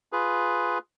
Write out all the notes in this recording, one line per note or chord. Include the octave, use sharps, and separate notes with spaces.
F4 G#4 B4